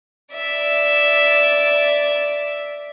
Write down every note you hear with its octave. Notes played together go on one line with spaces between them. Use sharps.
D5 E5